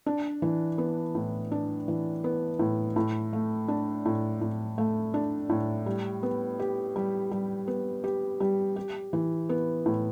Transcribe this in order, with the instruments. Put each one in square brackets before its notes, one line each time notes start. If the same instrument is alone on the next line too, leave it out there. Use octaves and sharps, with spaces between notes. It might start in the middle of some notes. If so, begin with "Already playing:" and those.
[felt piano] D4
E3
B3
A2
D4
E3
B3
A2
A2
A3
D4
A2
A2
A3
D4
A2
G3
B3
G4
G3
G3
B3
G4
G3
G4
E3
B3
A2